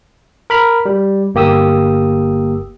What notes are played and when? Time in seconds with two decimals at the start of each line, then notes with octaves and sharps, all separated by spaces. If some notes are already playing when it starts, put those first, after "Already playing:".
0.50 A#4 B5 F6
0.86 G3
1.35 G1 A#3 G4 D#6 E6